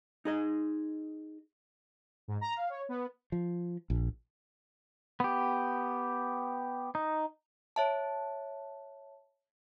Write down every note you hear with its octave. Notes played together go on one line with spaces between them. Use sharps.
D#4 G#4 D#5
G#2
A#5
F5
C#5
B3
F3
A#1
B3 G4
D#4
C#5 E5 A5